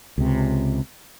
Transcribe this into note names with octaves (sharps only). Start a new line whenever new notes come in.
C#2 C3